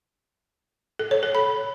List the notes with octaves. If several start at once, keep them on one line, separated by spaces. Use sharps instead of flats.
A4
C#5
A4
B5